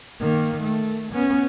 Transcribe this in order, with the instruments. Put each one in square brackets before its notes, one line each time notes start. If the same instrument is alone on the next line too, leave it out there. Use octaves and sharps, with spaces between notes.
[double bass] D#3 A#3
A3
B3 C#4